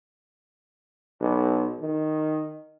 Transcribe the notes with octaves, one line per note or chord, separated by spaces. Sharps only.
B1
D#3